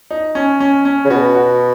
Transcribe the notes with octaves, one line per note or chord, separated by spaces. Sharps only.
D#4
C#4
C#4
C#4
C#3
B2 F#4
F#4